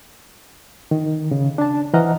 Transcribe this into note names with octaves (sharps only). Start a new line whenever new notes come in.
D#3
C#3
D4 A5
E3 C5 D#5 F#5 A#5 F6